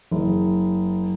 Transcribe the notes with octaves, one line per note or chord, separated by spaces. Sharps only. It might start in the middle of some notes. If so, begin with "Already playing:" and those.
F#1